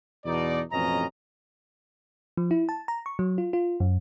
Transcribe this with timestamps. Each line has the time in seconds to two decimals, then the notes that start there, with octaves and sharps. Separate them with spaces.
0.26 E2 B2 D#4 D5
0.72 A1 F2 B2 C#4 D#5 A#5
2.37 F3
2.51 E4
2.69 A5
2.88 A#5
3.06 C#6
3.19 F#3
3.38 F4
3.53 F4
3.80 F#2